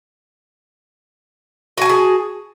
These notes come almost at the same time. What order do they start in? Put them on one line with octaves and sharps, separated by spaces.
F#4 G#5 A5 G#4